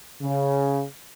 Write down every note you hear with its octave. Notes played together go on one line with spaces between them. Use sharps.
C#3